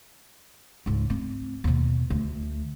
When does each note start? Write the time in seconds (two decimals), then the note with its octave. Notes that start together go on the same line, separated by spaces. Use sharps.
0.86 C#2 G#2
1.10 C4
1.64 D#2 B2
2.10 D2